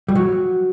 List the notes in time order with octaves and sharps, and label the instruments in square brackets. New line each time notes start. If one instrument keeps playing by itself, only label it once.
[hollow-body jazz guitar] G3
F#3